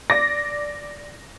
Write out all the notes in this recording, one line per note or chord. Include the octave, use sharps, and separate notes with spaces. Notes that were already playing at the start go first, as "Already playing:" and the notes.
D5 D6 A#6